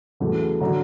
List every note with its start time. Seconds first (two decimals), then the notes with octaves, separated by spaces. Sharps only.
0.20 E2 C#3 F#3 A3
0.60 D3 F#3 A#5